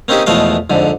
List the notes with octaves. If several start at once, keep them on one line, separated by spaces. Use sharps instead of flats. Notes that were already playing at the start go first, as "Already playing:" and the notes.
A#3 C4 C#4 D#4 G4 G#4
E2 B2 F3 G#3 A3 F5
F2 G#2 D3